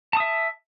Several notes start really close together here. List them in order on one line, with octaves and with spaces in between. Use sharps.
A5 D#6 E5